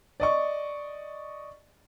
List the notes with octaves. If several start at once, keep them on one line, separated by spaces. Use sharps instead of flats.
D5 D#5 C#6